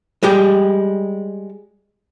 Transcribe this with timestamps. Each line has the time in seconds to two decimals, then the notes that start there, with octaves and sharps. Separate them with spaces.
0.23 G3 G#3 G4